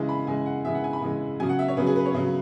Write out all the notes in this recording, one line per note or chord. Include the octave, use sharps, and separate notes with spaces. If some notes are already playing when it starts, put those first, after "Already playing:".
Already playing: C#3 E3 G#3
B5
C#3 E3 G#3 G#5
F#5
C#3 E3 G#3 E5
F#5
G#5
B5
C#3 E3 G#3
C#3 F#3 G#5
F#5
E5
C#5
C#3 F#3 B4
G#4
B4
C#5
C#3 F#3